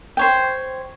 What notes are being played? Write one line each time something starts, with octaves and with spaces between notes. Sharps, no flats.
C5 C#5 G5